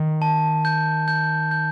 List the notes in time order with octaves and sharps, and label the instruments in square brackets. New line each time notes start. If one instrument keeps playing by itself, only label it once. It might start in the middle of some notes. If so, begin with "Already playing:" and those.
Already playing: [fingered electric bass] D#3
[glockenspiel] A5
G6
G6
G6